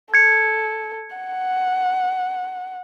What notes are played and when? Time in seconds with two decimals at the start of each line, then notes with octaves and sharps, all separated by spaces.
0.14 A4 G#6 C#7
1.16 F#5